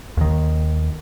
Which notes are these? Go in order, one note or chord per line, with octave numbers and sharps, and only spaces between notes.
D#2 D#3